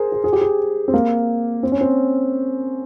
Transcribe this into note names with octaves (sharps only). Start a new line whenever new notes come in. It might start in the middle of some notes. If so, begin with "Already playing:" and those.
Already playing: G#4 A#4 C5
G#4
G#4
G4
G#4
C4
A#3
C4
C#4
C4